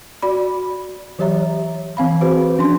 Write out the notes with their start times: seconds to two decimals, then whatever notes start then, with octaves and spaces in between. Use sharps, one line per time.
0.22 F#4 D5 B5
1.19 E3 F#3 G4 C#5 E5 A#5
1.97 E3 C4 F5 B5
2.21 F#4 G#4 B4 C5
2.58 F3 C#4 D4 C6